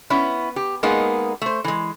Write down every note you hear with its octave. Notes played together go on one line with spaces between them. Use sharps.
B3 C#4 E4 B4
G4
G#3 A#3 B3 D#4 G#4 A#4
A3 C5
E3 G#3